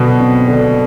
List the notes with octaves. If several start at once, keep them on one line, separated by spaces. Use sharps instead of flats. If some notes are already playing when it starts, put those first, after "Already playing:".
Already playing: B2 D3 F#3
C4
D3